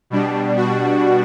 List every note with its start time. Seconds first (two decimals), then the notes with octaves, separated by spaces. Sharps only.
0.10 B2 G3 D4
0.57 F#4